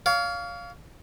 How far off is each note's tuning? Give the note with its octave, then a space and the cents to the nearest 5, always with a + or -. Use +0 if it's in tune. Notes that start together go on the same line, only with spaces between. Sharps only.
C#5 +40 F5 +0